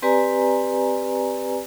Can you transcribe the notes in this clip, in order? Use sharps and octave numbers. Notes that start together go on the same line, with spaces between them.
C4 G4 B4 D5 G#5 A#5